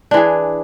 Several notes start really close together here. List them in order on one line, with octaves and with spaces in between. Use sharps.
D4 E3 G#4